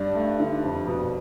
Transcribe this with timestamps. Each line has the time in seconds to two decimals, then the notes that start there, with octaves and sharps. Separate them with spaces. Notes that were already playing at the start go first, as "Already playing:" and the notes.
Already playing: G2 D4
0.15 A3
0.40 D3
0.63 F2
0.87 B2